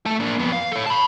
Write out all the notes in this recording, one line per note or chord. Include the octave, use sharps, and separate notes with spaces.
A3 A4
A#3 D4
F2 B3
F5
A4 C#5
A5 B5